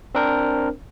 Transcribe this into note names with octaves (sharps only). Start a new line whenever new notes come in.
C4 D4 A#4 C5